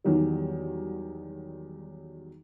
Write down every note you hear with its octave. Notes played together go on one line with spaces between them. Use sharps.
E2 D#3 F#3 G3